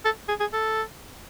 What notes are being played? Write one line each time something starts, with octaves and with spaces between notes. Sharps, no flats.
A4
G#4
G#4
A4